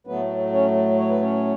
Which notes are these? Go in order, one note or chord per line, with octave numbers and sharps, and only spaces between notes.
A2 F#3 A3 B3 B4
C#4 C#5
C#5
B4
C#4 C#5